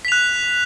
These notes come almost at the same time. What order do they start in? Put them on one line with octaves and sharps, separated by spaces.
B6 F7 F#6